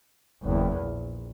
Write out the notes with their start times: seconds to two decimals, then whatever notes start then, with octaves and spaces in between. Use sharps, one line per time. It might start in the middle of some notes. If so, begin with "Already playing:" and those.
0.43 F#1 E2
0.78 A#1